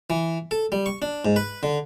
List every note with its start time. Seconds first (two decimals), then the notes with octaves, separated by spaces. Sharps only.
0.10 E3
0.51 A4
0.72 G3
0.86 C#6
1.02 D4
1.25 G#2
1.36 B4
1.63 D3